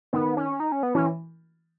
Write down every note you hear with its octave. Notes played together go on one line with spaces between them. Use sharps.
D#3 B3
C#4
D#4
C#4
B3
E3 C#4